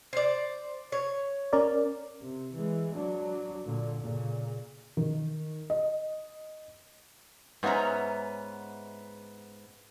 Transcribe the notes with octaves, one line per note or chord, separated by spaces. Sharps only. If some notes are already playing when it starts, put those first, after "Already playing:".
C5 D5
C#5
C#4 A#4 D5
C3
E3 G#3
F#3 D4
A#2 D3
A#2 C#3
D#3
D#5
G#2 B3 C#4 E5 A#5